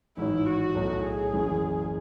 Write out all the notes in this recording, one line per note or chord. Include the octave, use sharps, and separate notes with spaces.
A1 G#2 D#3 F#3 E4
F#4
B1 A2 F#3 A3
G#4
F#1 F#2 E3